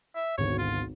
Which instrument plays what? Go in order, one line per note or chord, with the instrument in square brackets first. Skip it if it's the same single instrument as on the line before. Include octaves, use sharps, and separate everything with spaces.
[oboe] E5
[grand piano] G#1 D2 B2 [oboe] C#5
[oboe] F4